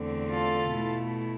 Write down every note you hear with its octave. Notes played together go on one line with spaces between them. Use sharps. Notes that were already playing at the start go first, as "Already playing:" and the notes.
Already playing: E2 D3 A3 C4
F4 A4
B2 A3 E4